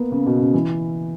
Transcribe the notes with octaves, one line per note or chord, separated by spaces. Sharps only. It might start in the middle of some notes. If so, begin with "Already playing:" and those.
Already playing: A#3 B3
C#3
B2
C#3
E3